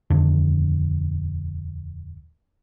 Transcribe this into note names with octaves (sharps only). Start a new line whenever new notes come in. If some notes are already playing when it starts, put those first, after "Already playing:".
D#1 F2 D3